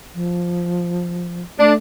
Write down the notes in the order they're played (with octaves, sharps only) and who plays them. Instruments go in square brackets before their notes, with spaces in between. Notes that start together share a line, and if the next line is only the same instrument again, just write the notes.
[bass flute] F3
[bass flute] A3 [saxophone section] D4